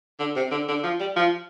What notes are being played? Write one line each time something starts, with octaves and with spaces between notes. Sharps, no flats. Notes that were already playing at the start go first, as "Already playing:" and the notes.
D3
C3
D3
D3
F3
G3
F3